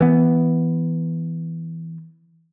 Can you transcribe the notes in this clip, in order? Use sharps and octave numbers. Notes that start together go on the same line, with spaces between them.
E3 B3